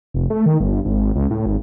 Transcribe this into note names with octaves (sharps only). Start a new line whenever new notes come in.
F1
A3
D#3
G1
G#1
C#2
A2
G#1